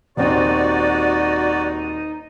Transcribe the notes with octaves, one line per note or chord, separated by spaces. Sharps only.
D#1 C4 D#4 F#4 D5